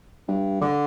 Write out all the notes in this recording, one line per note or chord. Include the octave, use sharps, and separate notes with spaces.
G2
D3